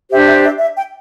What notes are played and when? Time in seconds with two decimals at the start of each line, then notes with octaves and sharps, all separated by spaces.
0.11 D4 G4 C5 E5
0.28 E5
0.44 E5
0.60 E5
0.77 G5